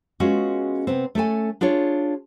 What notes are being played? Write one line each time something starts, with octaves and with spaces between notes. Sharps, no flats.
G#3 B3 C#4 F4 F#4 G#4
C3 B3 C4
A3 C#4 A4 G#5
D4 F4 G#4 C#5